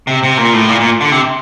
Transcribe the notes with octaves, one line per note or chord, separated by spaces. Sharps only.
C3
C3
A#2
A2
A#2
A#2
D3
C3